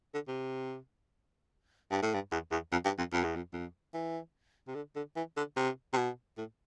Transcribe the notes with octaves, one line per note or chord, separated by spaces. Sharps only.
D3
C3
G2
A2
G2
E2
E2
F2
G2
F2
F2
E2
F2
F2
E3
C3
D3
D3
E3
D3
C3
C3
B2
A2